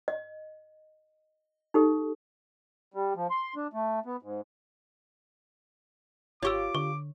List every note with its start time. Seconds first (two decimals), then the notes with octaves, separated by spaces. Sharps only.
0.08 D#5
1.74 D#4 G4 A4
2.94 G3
3.16 F3
3.30 C6
3.56 D4
3.73 A3
4.06 B3
4.22 G#2
6.43 G#1 F4 G4 C#5 C#6 D6 E6
6.75 D3 C#6